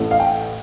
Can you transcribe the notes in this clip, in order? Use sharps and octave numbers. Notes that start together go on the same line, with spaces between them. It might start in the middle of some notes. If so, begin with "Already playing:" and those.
Already playing: A1 A2 A3
F5
G5